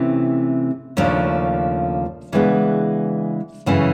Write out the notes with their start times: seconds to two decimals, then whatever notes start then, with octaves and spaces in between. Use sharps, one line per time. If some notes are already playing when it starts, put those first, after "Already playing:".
Already playing: C3 E3 A3 C#4 E4
0.97 D#2 C#3 F3 A3 D4
2.32 C#3 E3 G#3 B3 D4
3.66 F#2 C#3 E3 A3 C#4